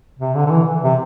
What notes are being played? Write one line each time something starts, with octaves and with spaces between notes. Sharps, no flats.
C3
D3
D3
E3
C3